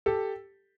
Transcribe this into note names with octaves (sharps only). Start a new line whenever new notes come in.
G4 A4